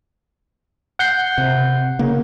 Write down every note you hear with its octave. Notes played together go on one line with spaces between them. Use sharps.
F#5 G6 C7
C3
C#3 A#3